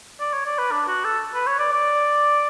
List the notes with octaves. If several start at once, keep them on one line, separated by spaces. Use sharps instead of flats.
D5
C#5
D5
B4
D4
F#4
A4
B4
C#5
D5
D5